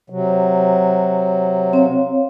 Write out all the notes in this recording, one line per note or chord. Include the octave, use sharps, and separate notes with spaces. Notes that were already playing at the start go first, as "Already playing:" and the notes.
C3 F#3
C4 C#5 F5